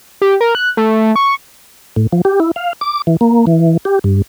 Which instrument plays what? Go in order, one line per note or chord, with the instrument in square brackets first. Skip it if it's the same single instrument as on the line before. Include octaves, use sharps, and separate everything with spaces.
[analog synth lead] G4
A#4
F#6
A3
C#6
[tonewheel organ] A2
F3
G4
E4
F5
D6
E3
A#3
E3
G4
G2